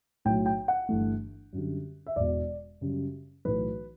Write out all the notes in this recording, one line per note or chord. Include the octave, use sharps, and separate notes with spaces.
B1 A2 F#3 G5
G5
F#5
G1 G2 E3 A3
F#2 D3 G3
E5
E1 E2 B2 D5
F#2 C#3 G3
B1 A2 E3 A3 B4